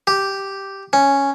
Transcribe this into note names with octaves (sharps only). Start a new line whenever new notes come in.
G4
C#4